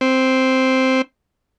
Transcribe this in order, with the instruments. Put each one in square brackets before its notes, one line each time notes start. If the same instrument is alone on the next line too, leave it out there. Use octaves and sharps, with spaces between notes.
[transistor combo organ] C4